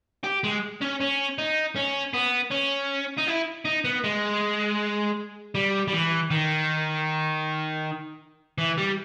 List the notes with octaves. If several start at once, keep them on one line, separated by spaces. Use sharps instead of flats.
G4
G#3
C#4
C#4
D#4
C#4
B3
C#4
D#4
E4
D#4
B3
G#3
G3
G3
E3
D#3
E3
G3